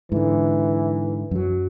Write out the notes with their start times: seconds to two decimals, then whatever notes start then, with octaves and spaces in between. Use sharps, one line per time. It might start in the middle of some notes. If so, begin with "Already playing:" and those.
0.12 G#2 D3 E3
1.31 F#2 F#3